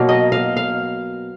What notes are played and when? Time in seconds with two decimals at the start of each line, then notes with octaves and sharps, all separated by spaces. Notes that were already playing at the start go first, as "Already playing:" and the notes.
Already playing: B2 F#3 A#3 F5
0.09 D#5
0.32 F5
0.57 F5